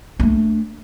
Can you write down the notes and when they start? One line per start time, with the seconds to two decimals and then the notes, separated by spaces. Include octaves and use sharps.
0.20 A3 D4